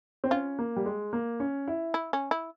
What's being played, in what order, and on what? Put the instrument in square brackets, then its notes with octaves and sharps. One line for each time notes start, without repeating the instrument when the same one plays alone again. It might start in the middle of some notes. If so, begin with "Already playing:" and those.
[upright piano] C4
[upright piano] C#4 [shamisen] F4
[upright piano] A#3
G3
G#3
A#3
C#4
E4
[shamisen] E4
C#4
E4